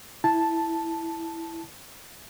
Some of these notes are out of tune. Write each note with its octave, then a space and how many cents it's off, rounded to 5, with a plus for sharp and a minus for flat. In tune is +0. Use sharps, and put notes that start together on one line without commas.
E4 +0 A5 +0